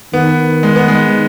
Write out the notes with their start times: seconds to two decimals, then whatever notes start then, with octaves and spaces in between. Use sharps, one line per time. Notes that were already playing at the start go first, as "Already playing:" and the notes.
0.13 D#3 B3
0.63 G#3
0.76 B3
0.88 G#3